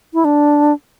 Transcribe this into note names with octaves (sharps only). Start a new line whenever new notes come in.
E4
D4